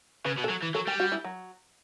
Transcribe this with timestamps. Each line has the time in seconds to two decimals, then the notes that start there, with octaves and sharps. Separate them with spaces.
0.25 C#3 B4
0.38 B2
0.44 A4
0.50 F#3
0.63 E3
0.74 F#3 A4
0.87 G3 G4
1.00 F#4
1.12 E4
1.24 F#3